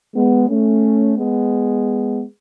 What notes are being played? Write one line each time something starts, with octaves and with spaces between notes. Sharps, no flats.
G#3 B3
A3 C#4
G#3 B3